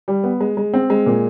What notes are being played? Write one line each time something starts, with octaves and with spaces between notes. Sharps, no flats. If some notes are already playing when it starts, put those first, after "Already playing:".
G3
B3
G#3
G#3
C4
G#3
A#2